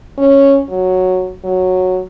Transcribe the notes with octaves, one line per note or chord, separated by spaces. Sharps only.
C#4
F#3
F#3